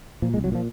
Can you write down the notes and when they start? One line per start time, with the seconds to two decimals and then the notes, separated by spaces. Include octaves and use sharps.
0.22 A#2 F3
0.34 G#3
0.37 C2
0.44 F#3
0.52 A#2 F3